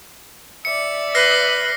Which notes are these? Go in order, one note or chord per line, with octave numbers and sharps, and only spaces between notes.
D5 E5 C#7
B4 F6 A#6 C7